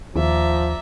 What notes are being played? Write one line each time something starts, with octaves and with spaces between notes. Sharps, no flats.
D#2 F3 D5 E5 A#5